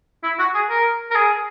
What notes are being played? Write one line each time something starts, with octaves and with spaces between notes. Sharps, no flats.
E4
F#4
G#4
A#4
A#4
G#4